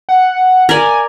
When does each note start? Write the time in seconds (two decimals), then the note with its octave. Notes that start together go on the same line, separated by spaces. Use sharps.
0.09 F#5
0.69 A#4 D5 G#5